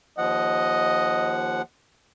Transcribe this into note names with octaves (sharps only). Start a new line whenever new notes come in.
D#2 F3 D#5 F#5